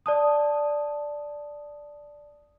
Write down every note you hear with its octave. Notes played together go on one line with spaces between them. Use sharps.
D5 A5 D#6